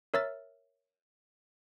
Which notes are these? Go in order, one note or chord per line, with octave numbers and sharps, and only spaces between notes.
A#4 C#5 E5 E6 F6 A6